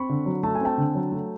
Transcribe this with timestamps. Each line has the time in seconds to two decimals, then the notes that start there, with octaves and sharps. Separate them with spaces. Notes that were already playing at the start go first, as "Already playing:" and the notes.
Already playing: C4 B5 C#6
0.09 D3
0.26 F#3
0.43 A3 A5
0.55 G#5
0.61 C4 G5 A5
0.78 D3
0.95 F#3
1.12 A3